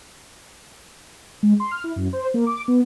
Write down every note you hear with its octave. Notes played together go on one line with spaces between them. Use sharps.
G#3
C6
F6
E4
F#2
C5
A#3
D6
B3